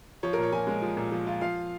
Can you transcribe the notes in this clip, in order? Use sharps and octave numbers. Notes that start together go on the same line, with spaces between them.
F3 C#5
A#4
A#2 C#5
F3 G#5
G#3
F3
A#2
F3
F4
F3 F5